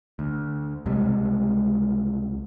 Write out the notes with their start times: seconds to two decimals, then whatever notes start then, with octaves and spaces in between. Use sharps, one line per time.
0.19 D2
0.86 C#2 C3 G3 G#3